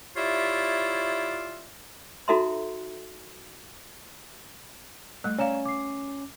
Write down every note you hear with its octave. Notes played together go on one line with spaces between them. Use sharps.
E4 F4 G4 C#5 D5 E5
D#4 F#4 A4 E5 A#5 C6
G3 A3 F#6
C#4 C#5 D5 F5 A#5 E7
D6 C7